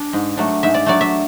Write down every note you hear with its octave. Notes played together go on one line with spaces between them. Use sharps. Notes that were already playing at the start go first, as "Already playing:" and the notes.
Already playing: D4
G#2
F#3 A3 D4
G#2 E5
D5
F#3 A3 D4 D5
E5